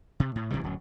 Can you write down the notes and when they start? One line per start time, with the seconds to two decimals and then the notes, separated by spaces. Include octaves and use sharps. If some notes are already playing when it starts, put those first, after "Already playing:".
0.20 C3
0.36 A2
0.51 E1 C3 E3 G3
0.63 D1 F#2 F#3